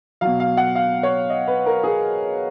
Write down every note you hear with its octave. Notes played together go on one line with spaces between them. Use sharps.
B2 F#3 F5
F5
F#5
F5
C#5
D#5
B4
A#4
G#4